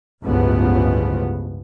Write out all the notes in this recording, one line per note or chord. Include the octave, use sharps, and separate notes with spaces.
G1 C#2 A2 C#3 F3 B3